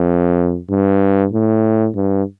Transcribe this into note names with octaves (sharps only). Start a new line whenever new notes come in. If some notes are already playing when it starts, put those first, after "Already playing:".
Already playing: F2
G2
A2
G2